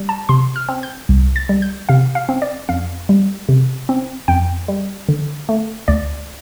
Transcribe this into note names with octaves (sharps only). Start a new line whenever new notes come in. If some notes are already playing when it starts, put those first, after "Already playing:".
Already playing: G3
A5
C3 C6
F6
C4
G6
C2
A6
G3
G6
C3 F5
F5
C4
D5
F2 F5
G3
C3
C4
F2 G5
G3
D3
A3
D2 D5